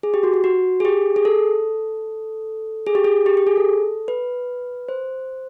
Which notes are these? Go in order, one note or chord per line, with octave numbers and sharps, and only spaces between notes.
G#4
G4
F#4
F#4
F#4
G#4
G4
G#4
A4
G#4
G4
G#4
G4
G4
G#4
A4
B4
C5